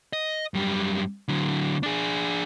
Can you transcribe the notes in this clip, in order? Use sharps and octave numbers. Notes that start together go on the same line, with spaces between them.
D#5
F#2 G3
D3 F#3
D4 G#4